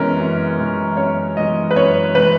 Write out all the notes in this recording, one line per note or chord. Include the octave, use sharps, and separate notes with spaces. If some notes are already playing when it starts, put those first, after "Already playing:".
Already playing: F#2 E3 G#3 B3 C#4 A#4
F#2
E3 G#3
F#2 C#5
E3 G#3 D#5
B4
F#2 C#5
E3 G#3 B4